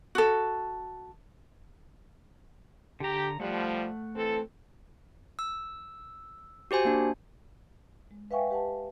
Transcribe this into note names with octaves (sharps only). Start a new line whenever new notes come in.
F#4 A4
D3 G4 A#5
F3 G3 A3 F#5
E3 C4 A4
E6
F#4 G4 C5 G#5
A#3 D4
G#3
B4 E5 F5 G5 G#5 C#6
G4 B4 F#5 A5